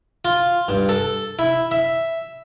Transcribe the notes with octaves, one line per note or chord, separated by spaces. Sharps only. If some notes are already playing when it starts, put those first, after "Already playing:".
F4
G2
A4
E4
E5